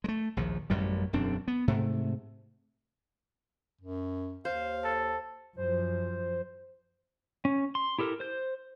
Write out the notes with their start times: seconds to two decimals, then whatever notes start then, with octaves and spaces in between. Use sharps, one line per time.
0.04 G#3 A3
0.37 A#1 D#2 F3
0.70 A1 F#2 A#2 G3
1.13 E1 F#2 C4 D4
1.48 B3
1.68 G#2 C3 A3
3.81 F#2
4.45 D#2 C5 F5
4.84 A4
5.57 F#2 F3 C5
7.45 C#4
7.75 C6
7.99 E4 G4 A4 A#4
8.20 C5 G6